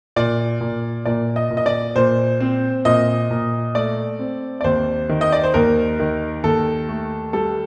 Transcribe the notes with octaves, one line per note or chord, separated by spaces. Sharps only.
A#2 D5
A#2
A#2 D5
D#5
A#2
D#5
D5
A#2 C5
C4
A#2 D#5
A#2
A3 D5
C4
D5
D#2 C5
D#3
D#5
D5
C5
D#2 A#4
D#3
D#2 A4
A3
G3 A4